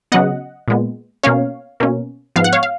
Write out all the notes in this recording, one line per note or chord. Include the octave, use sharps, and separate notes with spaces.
C#3 F#3 B3 D#5 F#5
A#2 G#3 B3
B2 A#3 C#4 C#5 F5
B2 A#3 C#4
G#2 F3 B3 F5
F#5
C#5 F5
F5